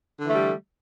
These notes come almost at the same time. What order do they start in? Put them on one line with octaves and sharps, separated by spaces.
D3 E3 A3 G3